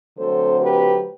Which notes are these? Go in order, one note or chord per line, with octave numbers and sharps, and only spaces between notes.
D3 F#3 A3 C4 A4 C5
G4 B4